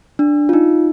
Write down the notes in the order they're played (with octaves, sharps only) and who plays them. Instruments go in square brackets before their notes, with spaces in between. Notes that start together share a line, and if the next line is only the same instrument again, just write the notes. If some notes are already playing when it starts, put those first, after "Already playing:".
[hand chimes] D4
F4
D#4